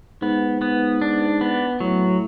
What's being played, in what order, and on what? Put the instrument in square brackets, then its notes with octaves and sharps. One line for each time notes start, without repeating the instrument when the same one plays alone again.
[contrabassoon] G#2 [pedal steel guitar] B3
[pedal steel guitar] B3
D4
B3
[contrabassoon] A2 [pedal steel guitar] F#3